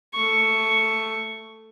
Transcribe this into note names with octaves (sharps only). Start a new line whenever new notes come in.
A3 C#6